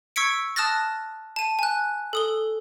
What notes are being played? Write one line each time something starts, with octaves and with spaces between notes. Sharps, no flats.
C#6 E6 G#6 B6 C#7 D7
A5 D#6 F6 F#6 A6 A#6
A5 D#7
G#5 F#6
A4 D#6 G7